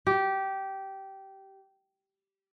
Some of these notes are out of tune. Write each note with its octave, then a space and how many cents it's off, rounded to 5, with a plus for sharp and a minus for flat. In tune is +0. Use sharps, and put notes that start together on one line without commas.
G4 -15